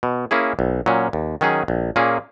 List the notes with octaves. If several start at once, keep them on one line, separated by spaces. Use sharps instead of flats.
B2
A#3 C#4 E4 G#4
B1
A#2 F#3 C#4
D#2
D#3 F#3 C#4 G#4
A#1
A#2 A#3 C#4 G#4